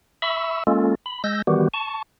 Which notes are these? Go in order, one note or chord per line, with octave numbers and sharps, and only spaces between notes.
E5 B5 C#6 E6
G#3 A#3 C#4 F4 A4
B5
G#3 E6 G6 A#6
D#3 E3 G3 B3 F#4 G4
A5 C#6